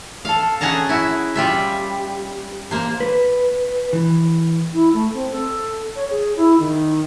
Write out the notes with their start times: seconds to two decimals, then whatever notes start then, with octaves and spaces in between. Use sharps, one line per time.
0.25 A4 F5
0.61 C#4 F#4 G#4 D#5 A5 A#5
0.89 E4 F#4 E5
1.35 G3 F4 E5
2.71 A#3 C5
3.00 B4
3.93 E3
4.73 E4
4.93 A3
5.14 C4
5.32 A4
5.96 C#5
6.10 G#4
6.37 E4
6.59 D#3